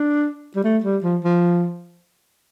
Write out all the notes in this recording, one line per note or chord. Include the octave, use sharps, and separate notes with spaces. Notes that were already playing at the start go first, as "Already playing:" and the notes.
Already playing: D4
G3
A3
G3
F3
F3